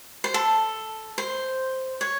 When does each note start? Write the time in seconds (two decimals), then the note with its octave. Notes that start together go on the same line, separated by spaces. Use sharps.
0.24 C5
0.34 A4
1.18 C5
2.01 C#5